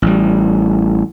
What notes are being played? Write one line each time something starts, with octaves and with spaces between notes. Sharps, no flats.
A1 G3